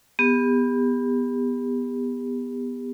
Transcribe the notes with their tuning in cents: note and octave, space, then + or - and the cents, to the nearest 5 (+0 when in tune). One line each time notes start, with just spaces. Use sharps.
B3 +0 G4 +35